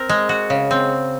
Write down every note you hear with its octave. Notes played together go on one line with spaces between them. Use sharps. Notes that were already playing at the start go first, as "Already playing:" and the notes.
Already playing: C4 A#4
G#3
F#4
C#3
C4